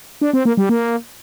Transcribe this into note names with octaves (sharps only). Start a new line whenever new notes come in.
D4
C4
A#3
G3
A#3